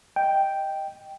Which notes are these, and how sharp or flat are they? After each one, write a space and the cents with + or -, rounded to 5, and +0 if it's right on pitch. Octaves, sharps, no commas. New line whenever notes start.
D#5 +0 G5 +0